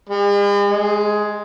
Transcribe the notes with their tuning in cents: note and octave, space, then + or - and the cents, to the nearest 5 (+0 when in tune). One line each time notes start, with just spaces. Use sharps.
G#3 -45
G#3 +10